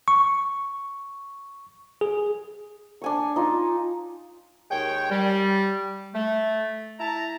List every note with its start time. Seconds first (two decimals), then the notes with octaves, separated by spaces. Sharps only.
0.08 C#6
2.01 G#4
3.02 D4 G#5 C#6
3.36 D#4 F4
4.71 D#2 G#3 C#5 G5
5.10 G3
6.15 A3
7.00 E4 A5 A#5